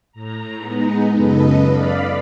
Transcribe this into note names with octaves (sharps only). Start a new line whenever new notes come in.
A2 A#5
G#3 B3 D#4
F#2 C#3 A4 B4 D#5
D5 F5 B5